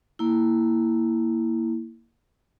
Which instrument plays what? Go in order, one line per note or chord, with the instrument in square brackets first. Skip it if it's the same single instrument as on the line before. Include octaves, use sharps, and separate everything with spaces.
[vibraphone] A#3 E4